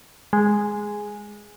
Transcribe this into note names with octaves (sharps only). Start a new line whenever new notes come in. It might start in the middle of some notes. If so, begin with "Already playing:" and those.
G#3